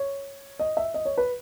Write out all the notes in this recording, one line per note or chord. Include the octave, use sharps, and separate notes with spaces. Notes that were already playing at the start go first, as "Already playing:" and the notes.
Already playing: C#5
D#5
E5
D#5
C#5
B4